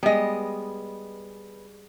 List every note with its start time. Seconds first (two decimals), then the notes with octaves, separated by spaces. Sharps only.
0.03 G3 G#3 B3 D#5